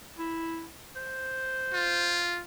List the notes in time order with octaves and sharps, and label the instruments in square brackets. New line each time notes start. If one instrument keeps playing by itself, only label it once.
[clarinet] E4
C5
[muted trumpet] F4